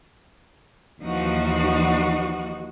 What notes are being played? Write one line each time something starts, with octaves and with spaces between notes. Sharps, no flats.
D#2 E3 F3 D#4 F#4